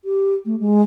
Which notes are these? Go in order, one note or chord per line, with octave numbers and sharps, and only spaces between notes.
G4
A3
G#3